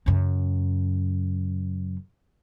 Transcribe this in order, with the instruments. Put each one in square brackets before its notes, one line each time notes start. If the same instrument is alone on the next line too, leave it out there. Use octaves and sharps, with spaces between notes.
[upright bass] F#2 C#3